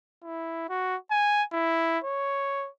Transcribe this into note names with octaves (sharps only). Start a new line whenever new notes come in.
E4
F#4
G#5
E4
C#5